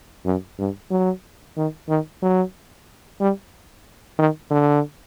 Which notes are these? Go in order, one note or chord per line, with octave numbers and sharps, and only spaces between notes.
F#2
G2
F#3
D#3
D#3
F#3
G3
D#3
D3